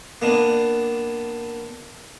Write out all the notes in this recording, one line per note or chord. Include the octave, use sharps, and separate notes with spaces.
A#3 B3 D4